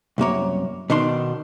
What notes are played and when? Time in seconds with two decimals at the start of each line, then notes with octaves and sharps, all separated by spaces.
0.18 C2 F#2 A#3 C#5
0.90 B2 D#3 D4 C6